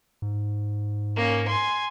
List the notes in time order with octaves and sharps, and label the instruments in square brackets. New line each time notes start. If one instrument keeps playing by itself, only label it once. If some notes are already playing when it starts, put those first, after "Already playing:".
[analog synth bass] G#2
[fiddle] A#3 C#4
G#5 C6